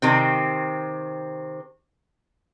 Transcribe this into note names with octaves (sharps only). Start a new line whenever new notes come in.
C3 D#3 C4